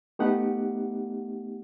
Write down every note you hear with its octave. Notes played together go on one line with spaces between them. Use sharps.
A3 B3 D#4 G4 F#5